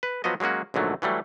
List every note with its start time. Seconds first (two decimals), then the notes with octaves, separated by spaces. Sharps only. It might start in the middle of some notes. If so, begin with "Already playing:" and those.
0.03 B4
0.24 F3 F#3 B3 F#4 D#5
0.40 F#3 G#3 A#3 C#4 F#4
0.74 A#1 G#2 D3 F#3 A3
1.02 E3 F#3 G3 A3